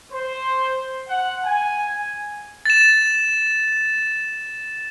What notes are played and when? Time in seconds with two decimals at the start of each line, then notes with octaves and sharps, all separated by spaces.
0.12 C5
1.09 F#5
1.44 G#5
2.65 A6 E7